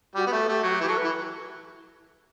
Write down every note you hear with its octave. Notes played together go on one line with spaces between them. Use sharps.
G3 F#4
B3 G4
A3 A4
A3 G4
F#3 F#4
G4
E3 G4
F#3 A4
B4
E3